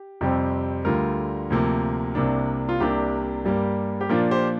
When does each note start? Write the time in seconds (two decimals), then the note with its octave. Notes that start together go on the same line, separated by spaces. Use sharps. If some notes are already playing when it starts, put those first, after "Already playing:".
Already playing: G4
0.21 F2 C3 G3 C4
0.85 D2 D3 G3 F4 A#4
1.50 D2 C3 F3 A#3
2.15 C2 C3 A#3 D4
2.69 F4
2.80 C2 C3 A#3 D4 G4
3.45 G2 G3 A#3
4.01 G4
4.09 A#2 F3 D4 F4 A#4
4.31 G4 C5